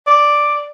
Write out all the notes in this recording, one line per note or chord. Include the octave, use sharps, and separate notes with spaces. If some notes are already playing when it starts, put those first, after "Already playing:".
D5